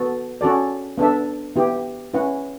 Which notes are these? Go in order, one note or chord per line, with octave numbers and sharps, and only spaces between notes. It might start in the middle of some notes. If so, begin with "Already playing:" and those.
Already playing: B3 F#4 A4
C#4 F#4 A4 D5
B3 D4 A4 E5
B3 E4 G4
C#4 E4 B4 F#5